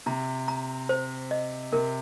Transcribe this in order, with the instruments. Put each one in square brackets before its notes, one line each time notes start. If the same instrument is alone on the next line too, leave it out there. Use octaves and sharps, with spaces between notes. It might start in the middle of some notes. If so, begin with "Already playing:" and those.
[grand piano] C3 [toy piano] A#5
[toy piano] A#5
C5
D#5
[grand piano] C3 [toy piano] A#4